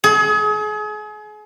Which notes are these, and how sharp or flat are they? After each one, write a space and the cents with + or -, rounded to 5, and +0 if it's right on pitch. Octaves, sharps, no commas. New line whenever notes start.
G#4 +35